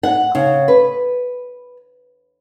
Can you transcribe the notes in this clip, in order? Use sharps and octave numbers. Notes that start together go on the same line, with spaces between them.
F#5
C#3
B4